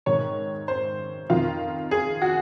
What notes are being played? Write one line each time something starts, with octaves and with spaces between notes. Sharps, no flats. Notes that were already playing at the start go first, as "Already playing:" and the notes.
G#2 D#3 C#5
C5
F2 D#3 F4
G#4
F#4